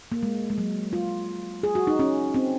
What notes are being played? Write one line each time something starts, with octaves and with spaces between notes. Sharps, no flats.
A#3
G#3
G#3
F#3
F4
G#4
F#4
D#4
C#4
C4